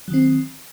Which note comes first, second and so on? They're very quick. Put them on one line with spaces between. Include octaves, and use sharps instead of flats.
F#3 D#3 C4